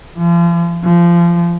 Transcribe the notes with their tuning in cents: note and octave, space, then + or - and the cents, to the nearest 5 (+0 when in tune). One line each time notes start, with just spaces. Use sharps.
F3 -40
F3 -25